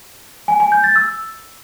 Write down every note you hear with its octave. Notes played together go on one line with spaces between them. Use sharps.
G#5
G#5
G6
A6
E6